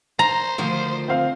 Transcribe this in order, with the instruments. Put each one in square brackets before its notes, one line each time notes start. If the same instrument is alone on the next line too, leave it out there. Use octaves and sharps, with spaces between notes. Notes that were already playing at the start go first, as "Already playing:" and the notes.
[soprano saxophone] C5 [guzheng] A#5
[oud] D2 D#3 F3
[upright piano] C4 F5